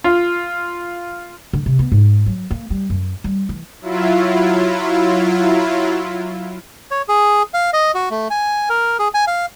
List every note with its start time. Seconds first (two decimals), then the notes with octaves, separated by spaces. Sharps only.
0.04 F4
1.53 D3
1.66 C3
1.79 B3
1.92 G#2
2.26 F#3
2.51 A#3
2.70 G3
2.90 F#2
3.24 G3
3.49 E3
3.81 F#3 E4 F4
6.91 C#5
7.09 G#4
7.54 F5
7.73 D#5
7.95 F#4
8.10 A3
8.30 G#5
8.69 A#4
8.99 G#4
9.14 G#5
9.27 F5